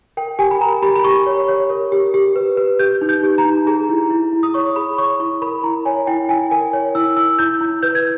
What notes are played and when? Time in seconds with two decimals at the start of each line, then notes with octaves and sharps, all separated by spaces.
0.17 A#4 G5
0.39 G4 G#5
0.51 B5
0.61 A#4 A#5
0.82 G4 B5
0.96 B5
1.04 G4 C#6
1.26 C#5
1.48 C#5
1.70 A#4
1.92 G4
2.14 G4
2.36 B4
2.57 B4
2.79 G4 G6
3.01 D#4
3.09 G6
3.23 G4
3.38 A#5
3.45 D#4
3.67 G#4 A#5
3.89 E4
4.10 E4
4.33 E4
4.43 D#6
4.54 C#5 C#6
4.76 G#4 B5
4.98 C#5 C#6
5.20 E4 C#6
5.42 A#4 B5
5.63 E4 A#5
5.85 C#5 G#5
6.07 E4 G5
6.29 E4 G#5
6.51 A#4 G#5
6.73 C#5
6.95 E4 E6
7.17 E4 E6
7.39 E4 G6
7.61 E4
7.83 B4 G6
7.95 G#6